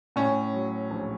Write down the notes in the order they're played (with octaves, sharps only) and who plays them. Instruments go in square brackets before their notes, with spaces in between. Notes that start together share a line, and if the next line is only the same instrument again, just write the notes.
[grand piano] A2 [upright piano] C#4
[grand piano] F#3
A#1